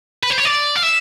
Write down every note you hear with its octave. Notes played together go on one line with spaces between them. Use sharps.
B4
C5
C#5
D5
F5
E5